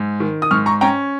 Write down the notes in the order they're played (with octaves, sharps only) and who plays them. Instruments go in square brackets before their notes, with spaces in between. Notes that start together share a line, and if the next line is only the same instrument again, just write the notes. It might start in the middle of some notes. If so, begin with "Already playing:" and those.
Already playing: [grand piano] G#2
D#3
D#6
G#2 C#6 F6
A#5 C#6
C#4 G5 A#5